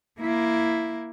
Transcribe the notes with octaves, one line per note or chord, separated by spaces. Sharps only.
A#3 E4